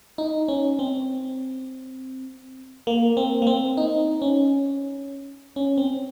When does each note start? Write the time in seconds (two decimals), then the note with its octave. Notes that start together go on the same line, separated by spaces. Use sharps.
0.18 D#4
0.48 C#4
0.79 C4
2.87 A#3
3.17 C4
3.42 A#3
3.47 C4
3.77 D#4
4.22 C#4
5.56 C#4
5.78 C4